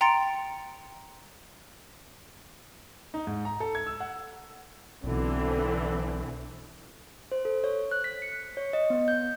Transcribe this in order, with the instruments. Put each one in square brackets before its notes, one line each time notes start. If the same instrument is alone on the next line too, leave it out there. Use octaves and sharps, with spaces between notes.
[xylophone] G5 A#5 C6 A6 C#7 D7
[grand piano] D#4
G#2
A#5
A4
G#6
E6
F#5
[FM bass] B1 [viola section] D3 E3 C4
[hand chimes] C5
A4
C#5
F#6
B6
C#7
C#5
D#5
B3
G6